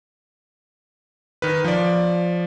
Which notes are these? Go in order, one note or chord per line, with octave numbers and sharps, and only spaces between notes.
D#3 B4
F3 D5